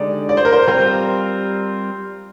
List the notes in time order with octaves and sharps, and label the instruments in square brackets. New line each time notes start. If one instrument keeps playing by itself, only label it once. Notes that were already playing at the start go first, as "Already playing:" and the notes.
Already playing: [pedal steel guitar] D3 G#3 D#4 G4 [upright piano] D5
[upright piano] D5
C5
A#4
C5
[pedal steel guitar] G3 C4 F4 A#4 [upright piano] C5